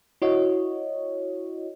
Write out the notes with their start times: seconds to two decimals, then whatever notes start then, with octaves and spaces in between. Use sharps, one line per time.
0.22 E4 F#4 C#5 D#5